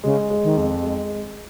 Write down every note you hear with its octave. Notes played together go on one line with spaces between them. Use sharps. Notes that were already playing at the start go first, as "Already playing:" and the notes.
C#3 G#3
G#3
D#3
F2
G#3